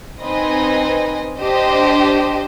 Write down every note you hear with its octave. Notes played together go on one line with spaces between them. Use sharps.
C4 D#4 B4 D#5 G#5
D4 G4 C5 D#5